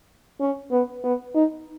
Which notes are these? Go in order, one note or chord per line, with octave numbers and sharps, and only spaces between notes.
C#4
B3
B3
D#4